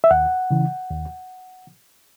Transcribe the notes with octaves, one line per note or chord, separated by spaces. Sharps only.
E5
D#2 F#5
C#3 E3
D#2